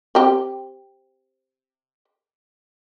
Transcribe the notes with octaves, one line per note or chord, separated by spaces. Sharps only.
C4 G4